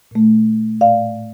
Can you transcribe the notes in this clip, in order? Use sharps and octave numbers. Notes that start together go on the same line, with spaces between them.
A#2 A3
A2 D5 F5